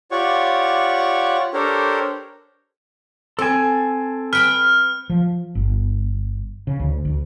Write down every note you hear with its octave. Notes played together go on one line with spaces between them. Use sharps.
F4 G4 C#5 D5 F#5 C#6
D4 G4 A4 A#4 C5 C#5
C4 A4 G#5
B4 G5 B5 F6
F3
G1
C#3
D2
D2